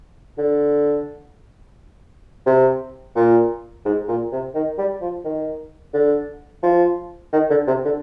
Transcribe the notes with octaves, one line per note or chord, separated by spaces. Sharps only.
D3
C3
A#2
G#2
A#2
C3
D#3
G3
F3
D#3
D3
F3
D#3
D3
C3
D3